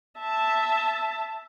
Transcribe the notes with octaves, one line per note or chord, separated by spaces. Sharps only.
E5 A5